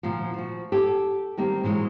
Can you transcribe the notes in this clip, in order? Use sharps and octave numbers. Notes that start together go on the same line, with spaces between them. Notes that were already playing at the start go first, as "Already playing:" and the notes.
D2 A#2 D#3 F3
F3 F#4
G4 A4
D#3 G3 A#3 C4
A#2 E3 F#3 G#3